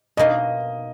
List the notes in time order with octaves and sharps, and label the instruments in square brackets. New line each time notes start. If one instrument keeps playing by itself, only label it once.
[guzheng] B2 A#3 D#4 [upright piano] D#5